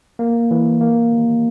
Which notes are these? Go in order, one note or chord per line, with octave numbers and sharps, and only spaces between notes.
A#3
E3
A#3
D#3